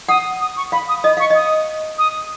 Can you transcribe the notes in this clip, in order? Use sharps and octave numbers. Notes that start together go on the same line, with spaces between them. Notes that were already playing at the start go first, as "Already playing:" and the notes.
F#5 D#6
D#6
C#6
F5 B5
D#6
D#5 D#6
F5 C#6
D#5 D#6
D#6